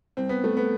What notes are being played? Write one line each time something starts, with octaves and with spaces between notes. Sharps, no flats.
C2 C4
B3
A3
B3